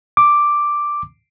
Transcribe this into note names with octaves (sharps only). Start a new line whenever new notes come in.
D6